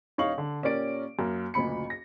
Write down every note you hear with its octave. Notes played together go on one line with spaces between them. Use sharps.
D#1 D#4 C#5 F5 C#6 F#7
D3
A#2 C#4 G4 A#4 D5 D7
F#2 A#3
F#1 D2 A#2 B5 C#7
A#6